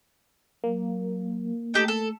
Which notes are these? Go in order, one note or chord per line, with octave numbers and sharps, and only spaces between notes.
F#3 A#3
A3 D#4 G4 A4
A4